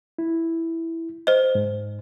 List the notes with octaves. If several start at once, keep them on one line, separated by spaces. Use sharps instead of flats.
E4
C5 D#5
G#2